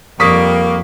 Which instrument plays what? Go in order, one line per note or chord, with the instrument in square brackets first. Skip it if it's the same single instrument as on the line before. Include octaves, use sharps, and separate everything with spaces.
[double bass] F2 [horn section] G3 A#3 [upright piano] C#6 D#6 B6